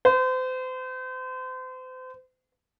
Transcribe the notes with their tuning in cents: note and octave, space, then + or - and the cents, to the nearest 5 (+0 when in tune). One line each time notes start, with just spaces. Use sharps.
C5 -35